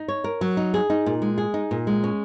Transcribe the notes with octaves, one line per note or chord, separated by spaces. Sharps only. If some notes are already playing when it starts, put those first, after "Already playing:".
Already playing: D#4
C#5
A#4
F#3
D#4
G#4
D#4
A#2
G#3
G#4
D#4
A#2
G#3
C#4